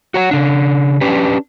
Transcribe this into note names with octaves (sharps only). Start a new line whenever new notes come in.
F#4 C#5 F#5
C#3 D4
C#4 D4 G4 B4